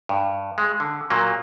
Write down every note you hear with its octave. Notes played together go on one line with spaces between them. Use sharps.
G2
G#3
D3
A#2 F#3 A#3